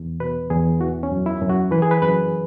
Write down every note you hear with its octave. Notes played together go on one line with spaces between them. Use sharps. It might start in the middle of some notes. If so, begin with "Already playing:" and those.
Already playing: E2
B2 B4
E2 G#4
E3 F#4
C#4
F#2
E4
F#2
F#4
E3 B4
G#4
B4
F#2 B4